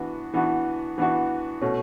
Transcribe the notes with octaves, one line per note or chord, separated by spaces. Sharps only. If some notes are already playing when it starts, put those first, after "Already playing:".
Already playing: E3 B3 D4 F#4
E3 B3 D4 F#4
E3 B3 D4 F#4
B2 A3 C#4